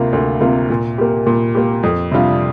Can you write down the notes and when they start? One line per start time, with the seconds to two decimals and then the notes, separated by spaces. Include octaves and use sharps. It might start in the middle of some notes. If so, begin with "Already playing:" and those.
Already playing: D2 C3 A#3 F4
0.13 D2
0.41 C3 A#3 F4
0.70 A#2
0.98 A#3 G4
1.26 A#2
1.55 A#3 G4
1.83 F2
2.11 C3 G3 D4 F4